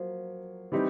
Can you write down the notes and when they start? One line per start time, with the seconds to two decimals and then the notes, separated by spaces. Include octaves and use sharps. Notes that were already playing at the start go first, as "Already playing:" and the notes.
Already playing: F3 F#3 A#3
0.72 E3 G3 C4 D#4 G4